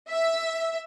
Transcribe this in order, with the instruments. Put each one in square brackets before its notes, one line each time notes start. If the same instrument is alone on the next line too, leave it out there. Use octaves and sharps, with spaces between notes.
[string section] E5